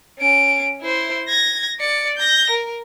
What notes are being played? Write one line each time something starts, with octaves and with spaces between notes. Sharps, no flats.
C#4 D7
E4 C5
G#6 A#6
D5 C#7
G6 A#6
A#4